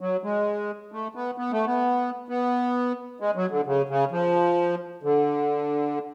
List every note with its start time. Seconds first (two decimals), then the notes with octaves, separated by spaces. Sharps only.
0.01 F#3
0.23 G#3
0.92 A3
1.15 B3
1.38 B3
1.51 A3
1.66 B3
2.29 B3
3.20 G#3
3.36 F#3
3.51 D3
3.66 C#3
3.89 C#3
4.11 F3
5.03 D3